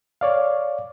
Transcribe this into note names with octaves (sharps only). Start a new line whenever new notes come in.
C#5 D5 F5